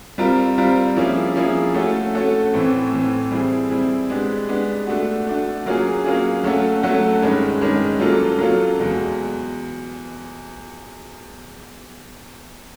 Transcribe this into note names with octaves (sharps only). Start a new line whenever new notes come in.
G3 C4 F4 A#4
G3 C4 F4 A#4
F3 A#3 C#4 E4 G#4
F3 A#3 C#4 E4 G#4
A3 C#4 F#4 A4
A3 C#4 F#4 A4
A2 E3 A3 C4
A2 E3 A3 C4
G3 C4 E4 G#4
G3 C4 E4 G#4
G#3 B3 D4 G4
G#3 B3 D4 G4
A3 D4 F#4
A3 D4 F#4
F#3 A#3 C#4 F4 G#4
F#3 A#3 C#4 F4 G#4
F#3 A3 C#4 F#4 A4
F#3 A3 C#4 F#4 A4
G2 D#3 G#3 C#4
G2 D#3 G#3 C#4
F#3 A#3 C#4 F4 A4
F#3 A#3 C#4 F4 A4
E2 B2 G#3